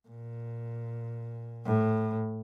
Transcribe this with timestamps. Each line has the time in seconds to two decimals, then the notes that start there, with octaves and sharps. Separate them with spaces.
0.08 A#2
1.65 A2